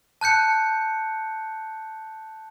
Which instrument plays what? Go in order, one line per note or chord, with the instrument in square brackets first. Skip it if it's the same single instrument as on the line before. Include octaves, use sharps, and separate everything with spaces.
[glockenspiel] A5 F#6 G6 C#7